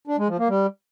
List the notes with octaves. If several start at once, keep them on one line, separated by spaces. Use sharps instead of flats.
D4
G#3
F3
A#3
G3